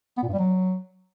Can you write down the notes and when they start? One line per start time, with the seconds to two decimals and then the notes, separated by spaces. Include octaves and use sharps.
0.18 B3
0.23 A#2
0.28 G2
0.33 G3
0.39 F#3